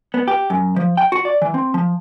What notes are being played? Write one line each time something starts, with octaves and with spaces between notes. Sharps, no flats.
B3
G4
F#2
F3
G5
F#4
D5
E3
C4
F3